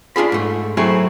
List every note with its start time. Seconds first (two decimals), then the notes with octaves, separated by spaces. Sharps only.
0.16 D4 F4 G#4 B5
0.32 G#2 A3
0.77 F#3 A3 C4 E4 G#4